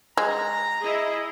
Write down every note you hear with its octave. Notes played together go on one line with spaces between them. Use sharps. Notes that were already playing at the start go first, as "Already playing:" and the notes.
G#3 A#5
E4 G#4 D#5